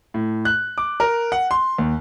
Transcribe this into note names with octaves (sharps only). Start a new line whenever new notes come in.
A2
F#6
D6
A#4
F#5
C6
D#2